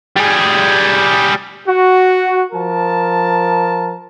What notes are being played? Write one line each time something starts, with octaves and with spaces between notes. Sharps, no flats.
G3 G#4
F#4
F3 A#4 A5